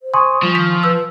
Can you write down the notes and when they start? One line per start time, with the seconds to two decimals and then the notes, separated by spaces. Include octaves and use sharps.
0.02 C5
0.14 G#5 C6 C#6 D#6
0.43 F3 G3
0.55 D#3 B6
0.84 B4 E6